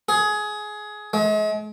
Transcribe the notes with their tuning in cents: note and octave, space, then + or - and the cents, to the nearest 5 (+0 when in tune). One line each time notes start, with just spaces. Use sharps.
G#4 +20
G#3 +40